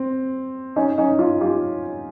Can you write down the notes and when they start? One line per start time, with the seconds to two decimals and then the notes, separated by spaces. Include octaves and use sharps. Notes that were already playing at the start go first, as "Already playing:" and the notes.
Already playing: C4
0.76 C#4 D#4
0.98 C#4 D#4
1.19 D#4 F4
1.41 F4 G4